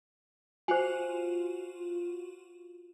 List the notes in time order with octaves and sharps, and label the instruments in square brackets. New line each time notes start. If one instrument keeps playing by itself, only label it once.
[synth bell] F4 F#4 [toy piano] C5 G#5